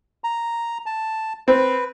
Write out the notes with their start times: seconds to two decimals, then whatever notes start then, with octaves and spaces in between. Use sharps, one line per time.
0.24 A#5
0.86 A5
1.48 C4 B4